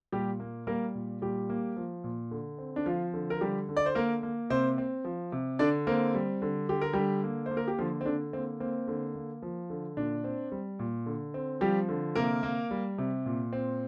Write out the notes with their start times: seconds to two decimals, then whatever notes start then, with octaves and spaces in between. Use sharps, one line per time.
0.12 A#2 G3 G4
0.40 A#3
0.67 G3 A#3 A#4
0.95 A#2
1.22 A#2 G3 G4
1.49 A#3
1.77 F3
2.04 A#2
2.31 D3
2.58 C4
2.76 D4
2.86 F3 F4
3.13 D3
3.30 A#4
3.41 D3 G3 G4
3.69 D3
3.77 D5
3.86 C5
3.95 A#3 A#4
4.23 A#3
4.50 C3 C4 C5
4.78 C4
5.05 F3
5.32 C3
5.59 D3 D4 D5
5.87 A#3 C4 A#4
6.15 G3
6.42 D3
6.69 D3 G4
6.81 A#4
6.93 D3 G3 G4
7.24 A#3
7.46 C5
7.51 A#3
7.57 A#4
7.68 G4
7.79 D3 F3 F4
8.01 C4
8.06 D3 D4
8.33 A#3 C4
8.60 A#3 C4
8.88 D3
9.15 A#3
9.42 F3
9.70 D3
9.97 A#2 D4
10.24 C4
10.52 G3
10.79 A#2
11.06 D3
11.34 C4
11.61 F3 G3 G4
11.89 D3
12.15 C3 A#3 A#4
12.43 A#3
12.71 G3
12.98 C3
13.26 A#2
13.53 C4